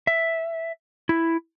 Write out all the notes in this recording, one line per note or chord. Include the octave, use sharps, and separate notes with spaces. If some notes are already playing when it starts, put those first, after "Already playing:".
E5
E4